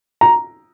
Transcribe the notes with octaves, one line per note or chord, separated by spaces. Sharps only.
A#5